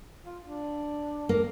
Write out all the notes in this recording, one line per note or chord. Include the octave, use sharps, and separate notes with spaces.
F4
D4
A#3